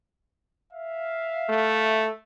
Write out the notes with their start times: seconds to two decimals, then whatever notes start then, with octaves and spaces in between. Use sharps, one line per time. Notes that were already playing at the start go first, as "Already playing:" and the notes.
0.72 E5 F5
1.49 A3